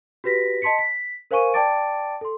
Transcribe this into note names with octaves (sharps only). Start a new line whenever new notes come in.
F#4 G4 B4 A#6 B6
D#5 A5 C6 B6 C#7
B6
A#4 C5 F5 G#5 C#6 D#7
D5 G5 A5 D6 A6 D7
A4 C6